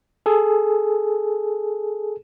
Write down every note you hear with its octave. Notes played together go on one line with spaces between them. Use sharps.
G#4 A4